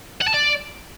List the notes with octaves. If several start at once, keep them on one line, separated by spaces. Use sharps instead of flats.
F#5
A5
D5